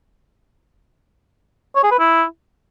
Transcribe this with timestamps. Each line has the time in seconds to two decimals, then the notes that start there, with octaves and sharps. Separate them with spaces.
1.75 C#5
1.83 G#4
1.91 B4
1.99 E4